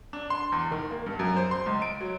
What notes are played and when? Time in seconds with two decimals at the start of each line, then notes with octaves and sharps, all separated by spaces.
0.13 D4
0.30 C6
0.52 E2
0.71 D#3
0.91 A#3
1.06 G2
1.19 F#2
1.37 C5
1.51 C6
1.66 C#2
1.82 D7
2.01 F#3